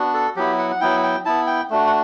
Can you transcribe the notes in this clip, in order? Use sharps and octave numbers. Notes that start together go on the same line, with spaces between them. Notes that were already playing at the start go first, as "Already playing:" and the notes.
Already playing: B3 D4 F#4
A4
F#3 B3 E4 G4
F#5
F#5
F#3 B3 E4 G5
G5
B3 E4 A5
G5
A3 D4 F#4
F#5